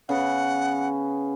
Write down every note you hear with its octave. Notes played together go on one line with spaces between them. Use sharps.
C#3 B3 C#4 F#5